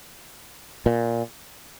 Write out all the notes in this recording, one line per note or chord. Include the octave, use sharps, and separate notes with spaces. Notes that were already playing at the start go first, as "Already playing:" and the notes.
A#2